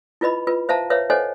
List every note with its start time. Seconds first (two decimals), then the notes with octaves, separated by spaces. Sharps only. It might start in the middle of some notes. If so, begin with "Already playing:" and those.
0.21 E4 F4 B4 D#5 B5
0.47 F4 B4
0.69 C5 E5 F5 A5 A#5
0.90 B4 C#5 E5 F5
1.10 A4 C5 C#5 D#5 F#5 G#5